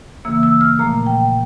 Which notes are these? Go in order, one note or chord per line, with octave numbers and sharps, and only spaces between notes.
C#3 E3 A#3 E6
E6
F6
A#2 F3 A3 A#5
G5